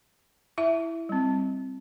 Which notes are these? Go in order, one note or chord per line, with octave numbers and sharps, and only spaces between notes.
E4 E5
G3 C4